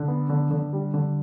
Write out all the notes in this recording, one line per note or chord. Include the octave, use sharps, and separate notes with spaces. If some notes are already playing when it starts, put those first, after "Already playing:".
Already playing: D3
B3
D3
D3
G3
D3